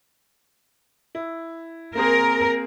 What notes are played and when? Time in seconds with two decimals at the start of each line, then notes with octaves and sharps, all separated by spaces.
1.15 E4
1.95 A#3 C4 G#4 A#4